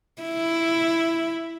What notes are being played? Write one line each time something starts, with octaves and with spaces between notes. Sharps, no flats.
E4